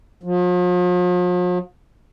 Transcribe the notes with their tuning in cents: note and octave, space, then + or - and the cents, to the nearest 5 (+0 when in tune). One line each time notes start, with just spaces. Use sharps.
F3 +45